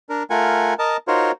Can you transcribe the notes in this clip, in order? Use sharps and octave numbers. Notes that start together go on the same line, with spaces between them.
D4 A#4
A3 F4 A#4 F#5 G#5
A#4 D#5 A5
D#4 F4 F#4 A#4 C5 C#5